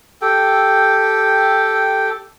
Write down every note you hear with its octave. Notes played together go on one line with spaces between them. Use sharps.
G4 A4 G5